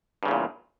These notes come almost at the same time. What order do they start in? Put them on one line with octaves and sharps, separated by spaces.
G2 C#3 E2 A#2